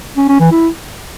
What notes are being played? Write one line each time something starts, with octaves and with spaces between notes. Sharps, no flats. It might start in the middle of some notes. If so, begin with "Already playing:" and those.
C#4
C#4
E3
E4